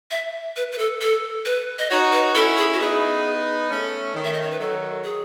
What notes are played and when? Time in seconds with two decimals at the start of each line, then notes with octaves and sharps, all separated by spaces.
0.11 E5
0.56 B4
0.72 B4
0.78 A4
1.01 A4
1.45 B4
1.79 D#5
1.90 D#4 F#4 C#5
2.12 B4
2.35 C#4 E4 A4
2.57 G#4
2.73 F#4
2.80 B3 D#4 G#4
3.70 A3 C#4
4.15 D#3
4.24 E5
4.33 D#5
4.42 C#5
4.51 B4
4.59 D#3 F#3 A4
5.04 G#4